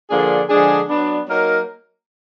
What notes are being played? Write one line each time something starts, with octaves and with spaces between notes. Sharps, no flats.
D3 F3 A#3 D4 G#4
D3 F3 G#3 D4 G#4
F#3 B3 D4
F#3 A#3 D#4 A#4